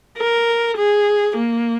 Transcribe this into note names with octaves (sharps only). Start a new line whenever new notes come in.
A#4
G#4
A#3